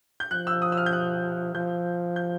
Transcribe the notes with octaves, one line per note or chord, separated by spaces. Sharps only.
G6
F3 F#6
E6
D#6
E6
F6
G6
F#6
F3 G6
G6